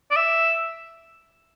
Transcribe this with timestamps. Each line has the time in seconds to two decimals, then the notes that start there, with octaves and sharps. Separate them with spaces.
0.11 D5
0.16 E5